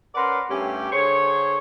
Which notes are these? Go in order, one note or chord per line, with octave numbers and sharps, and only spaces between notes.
C#4 A#4 B4 D5 F#5 C6
G2 A3 C#4 G4
D3 G#4 C5 C#5